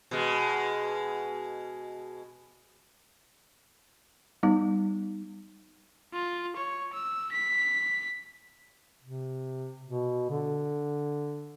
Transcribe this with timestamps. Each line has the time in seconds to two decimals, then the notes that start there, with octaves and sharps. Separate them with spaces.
0.11 B2 G#3
4.43 G3 B3 D#4
6.13 F4
6.56 C#5
6.93 E6
7.32 B6
9.02 C3
9.85 B2
10.30 D3